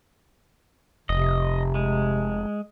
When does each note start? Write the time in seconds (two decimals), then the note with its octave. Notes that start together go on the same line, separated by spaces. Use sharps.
1.09 F1 C3 D#5
1.75 G#3